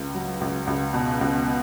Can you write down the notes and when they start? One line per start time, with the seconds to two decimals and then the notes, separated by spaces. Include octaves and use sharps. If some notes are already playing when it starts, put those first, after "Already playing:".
Already playing: C#2
0.15 F#3
0.41 C#2
0.67 C#2
0.94 B2
1.21 C#2